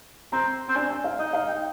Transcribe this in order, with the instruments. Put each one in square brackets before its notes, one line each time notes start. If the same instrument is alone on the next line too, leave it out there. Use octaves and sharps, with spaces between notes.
[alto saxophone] C4 [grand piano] A#5
[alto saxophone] C4
[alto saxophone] D4 [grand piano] G#5
[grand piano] G#5
F5
[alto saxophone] D#4 [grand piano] D#5
[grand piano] F5
G5